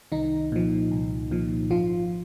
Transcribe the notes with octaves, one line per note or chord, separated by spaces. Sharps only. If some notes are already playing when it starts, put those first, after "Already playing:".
C2 D#3 D#4
A#2 F3
C2
A#2 F3
G#1 F3 F4